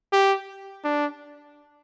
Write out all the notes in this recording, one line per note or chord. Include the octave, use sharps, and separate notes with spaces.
G4
D4